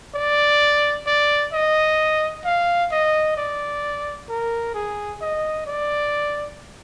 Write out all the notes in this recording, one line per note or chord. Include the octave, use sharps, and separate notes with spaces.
D5
D5
D#5
F5
D#5
D5
A#4
G#4
D#5
D5